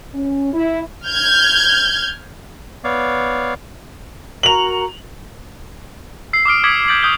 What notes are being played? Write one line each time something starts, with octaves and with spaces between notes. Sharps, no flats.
C#4
E4
F6 G6 G#6
B3 C#5 D5 F5
F#4 A#4 A#5 F7 F#7
E6 C7
D6 D#6 F6 D7
D6 D#6 G#6 B6 C#7 F#7
D#6 G6 A6 C7 D7 F#7
C#6 D#6 G6 G7